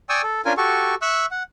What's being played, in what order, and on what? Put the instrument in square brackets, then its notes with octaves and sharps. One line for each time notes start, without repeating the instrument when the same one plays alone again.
[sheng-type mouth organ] D5 G5 G#5 C#6 D#6 E6
A4
C#4 D4 F4 A#4 G#5
F#4 G4 A4 C#6
E5 C#6 E6 F#6
F#5